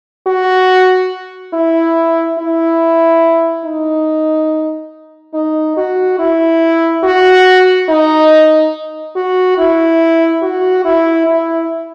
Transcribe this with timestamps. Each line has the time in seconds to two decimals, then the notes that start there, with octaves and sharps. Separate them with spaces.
0.27 F#4
1.53 E4
2.39 E4
3.65 D#4
5.34 D#4
5.77 F#4
6.19 E4
7.04 F#4
7.89 D#4
9.16 F#4
9.58 E4
10.42 F#4
10.85 E4
11.27 E4